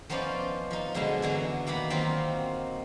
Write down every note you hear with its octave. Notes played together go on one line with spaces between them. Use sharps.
F3 B3 C#4 D#4 C5 D5
F3 D#4
B2 D3 F#3 G#3 B3
D3 E3 F#3
D#3 A#3 F#5 B5
D#3 F#3 A#3 C4 F4